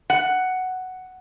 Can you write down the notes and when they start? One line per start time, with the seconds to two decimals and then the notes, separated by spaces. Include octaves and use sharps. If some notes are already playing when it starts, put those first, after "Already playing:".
0.10 F#5